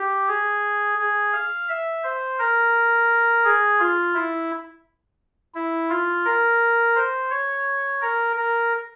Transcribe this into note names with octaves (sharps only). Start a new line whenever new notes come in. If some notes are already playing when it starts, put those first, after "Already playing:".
Already playing: G4
G#4
G#4
F5
E5
C5
A#4
G#4
F4
E4
E4
F4
A#4
C5
C#5
A#4
A#4